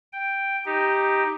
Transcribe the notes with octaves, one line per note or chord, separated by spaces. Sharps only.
G5
D#4 G4